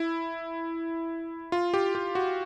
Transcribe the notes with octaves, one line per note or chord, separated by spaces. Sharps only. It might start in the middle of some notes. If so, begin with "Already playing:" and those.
Already playing: E4
F4
G4
G4
F#4